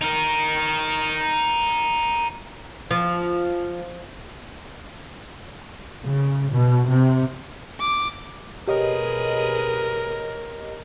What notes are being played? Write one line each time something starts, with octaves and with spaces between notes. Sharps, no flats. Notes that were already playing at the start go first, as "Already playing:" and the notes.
D#4 A#4
F3
C#3
B2
C3
D6
B2 G4 G#4 A#4 B4 C#5 D#5